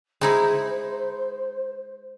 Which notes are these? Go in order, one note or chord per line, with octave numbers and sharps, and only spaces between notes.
G#3 D#4 E4 C5